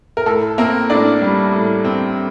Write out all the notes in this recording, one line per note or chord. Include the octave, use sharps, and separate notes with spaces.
A#4
A2 A4
A#3 C4 A#4
A2 D4 D5
G3
A2
C4